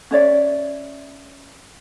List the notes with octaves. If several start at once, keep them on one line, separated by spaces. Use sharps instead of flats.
C#4 C#5 D5 E5